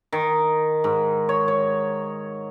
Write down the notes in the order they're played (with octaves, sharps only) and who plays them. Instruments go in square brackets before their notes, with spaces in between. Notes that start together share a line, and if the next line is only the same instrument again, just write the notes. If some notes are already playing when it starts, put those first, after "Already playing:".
[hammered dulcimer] D#3
G#2
C#5
C#5